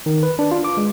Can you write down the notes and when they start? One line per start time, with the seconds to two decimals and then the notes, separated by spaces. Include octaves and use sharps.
0.06 D#3
0.23 B4
0.39 D4
0.51 F4
0.64 D6
0.77 G#3